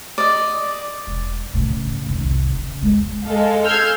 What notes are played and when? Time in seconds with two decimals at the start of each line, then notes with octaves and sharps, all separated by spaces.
0.18 D5 D#5
1.07 E1
1.54 A2 C#3
2.06 F2 D#3
2.21 C2
2.55 C#3
2.82 E2 G#3
3.24 G#3 A4 F5
3.65 E6 F6 G6 G#6 C7